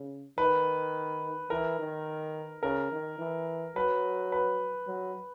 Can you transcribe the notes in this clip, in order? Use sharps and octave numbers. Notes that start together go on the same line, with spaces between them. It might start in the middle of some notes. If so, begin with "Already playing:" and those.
Already playing: C#3
D#3 B4
E3 A#4
D#3
C#3 A#4
D#3
E3
F#3 B4
B4
F#3